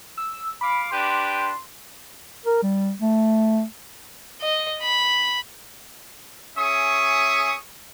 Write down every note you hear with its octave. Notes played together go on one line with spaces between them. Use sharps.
E6
F5 B5 D6
D4 G4 B4 C6
A#4
G3
A3
D#5
B5
C#4 G#4 E5 C#6 D#6